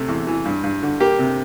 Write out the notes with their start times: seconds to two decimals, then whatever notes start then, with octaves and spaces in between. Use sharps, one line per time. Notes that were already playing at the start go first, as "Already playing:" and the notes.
Already playing: C3 A3
0.08 E2
0.27 E3
0.45 G2
0.64 G2
0.83 D3
1.00 A#3 G4
1.19 C3